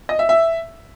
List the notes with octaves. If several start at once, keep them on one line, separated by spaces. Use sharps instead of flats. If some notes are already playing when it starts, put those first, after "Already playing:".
D#5
E5
E5